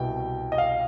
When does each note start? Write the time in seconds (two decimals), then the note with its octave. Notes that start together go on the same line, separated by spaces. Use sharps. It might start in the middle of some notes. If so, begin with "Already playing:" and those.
Already playing: C2 B2 G5
0.52 D#5
0.58 F5